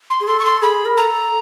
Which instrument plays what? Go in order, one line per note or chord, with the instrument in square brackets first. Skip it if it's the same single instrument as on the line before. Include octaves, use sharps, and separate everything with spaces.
[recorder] C6
[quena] G#4
[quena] A4 [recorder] C6
[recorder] C#6
C6
[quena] G#4 [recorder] B5
[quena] A#4
[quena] A4 [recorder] A#5